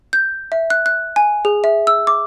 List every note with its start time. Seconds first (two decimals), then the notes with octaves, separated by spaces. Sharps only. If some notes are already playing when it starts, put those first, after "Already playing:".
0.13 G6
0.52 E5
0.70 F#6
0.86 F#6
1.16 G#5
1.45 G#4
1.64 E5
1.87 E6
2.07 D6